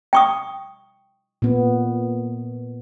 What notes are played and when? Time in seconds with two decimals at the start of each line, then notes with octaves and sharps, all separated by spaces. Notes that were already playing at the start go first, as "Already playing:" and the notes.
0.13 G5 C#6 D#6
1.42 A#2 B3